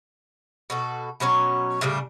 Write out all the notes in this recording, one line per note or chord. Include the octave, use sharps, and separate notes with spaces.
B2 F#4 A4
B2 F#3 C#4 C#5
A2 C#3 G3 D4